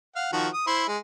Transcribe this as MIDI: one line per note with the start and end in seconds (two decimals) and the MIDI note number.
0.16 0.30 77
0.16 0.30 78
0.33 0.48 51
0.33 0.48 53
0.33 0.48 66
0.53 0.63 87
0.67 0.84 64
0.67 0.84 72
0.67 0.84 84
0.88 0.98 56